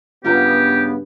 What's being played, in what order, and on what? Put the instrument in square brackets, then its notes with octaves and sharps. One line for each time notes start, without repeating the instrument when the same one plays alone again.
[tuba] G2 [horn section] C#3 B3 [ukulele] F4 A#4 A#5 [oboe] G4